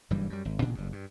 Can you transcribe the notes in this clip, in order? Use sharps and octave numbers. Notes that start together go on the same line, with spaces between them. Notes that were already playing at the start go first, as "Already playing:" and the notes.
F#1 G2 E3 G3
F#2 G3
G#1
A1 A#2 C#3 D4
F#1 G2
G2